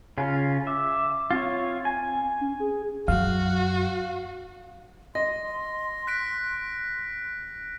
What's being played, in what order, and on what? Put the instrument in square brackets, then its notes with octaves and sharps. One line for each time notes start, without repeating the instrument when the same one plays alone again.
[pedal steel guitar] C#3 C#4 F4
[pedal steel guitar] E5 [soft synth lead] D6
[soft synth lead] C4 [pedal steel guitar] F4 C#5
[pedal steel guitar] G#5
[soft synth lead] C#4
G#4
[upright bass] F#2 [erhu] F#4 [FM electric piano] F5
[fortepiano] D#5 [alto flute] C6 [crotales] A#6
[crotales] F#6 B6 D7